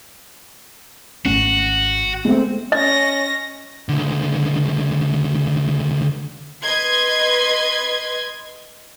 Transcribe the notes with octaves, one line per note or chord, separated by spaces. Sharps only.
G#1 A3 C#4 F#4
G#3 A3 C4
C#4 D#5 A#6
C#2 D3
B4 D#5 C6 G#6